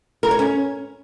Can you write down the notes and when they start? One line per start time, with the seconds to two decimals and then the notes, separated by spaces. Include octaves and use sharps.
0.23 A#4
0.31 C#5
0.39 C#4